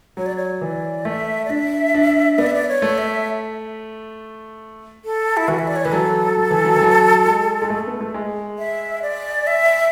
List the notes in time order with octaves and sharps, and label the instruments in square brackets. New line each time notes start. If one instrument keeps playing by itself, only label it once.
[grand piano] F#3 [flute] C#5
[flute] D5
C#5
[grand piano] E3 [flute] D5
[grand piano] A3 [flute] E5
[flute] D5
[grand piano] D4 [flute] E5
[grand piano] D4
[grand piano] B3 [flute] D5
[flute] E5
D5
C#5
[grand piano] A3
[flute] E5
A4
E4
[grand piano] E3 [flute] F#4
[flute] E5
D5
C#5
[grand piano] E3 [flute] B4
[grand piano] F#3 [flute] A4
[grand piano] F#3
E3
F#3
E3
F#3
G#3
G#3
A3
B3
A3
G#3
[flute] E5
D5
E5